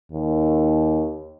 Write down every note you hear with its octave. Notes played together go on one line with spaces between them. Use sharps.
D#2